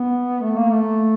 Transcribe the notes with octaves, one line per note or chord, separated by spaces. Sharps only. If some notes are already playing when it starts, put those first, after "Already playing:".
Already playing: B3
A3
A#3
A3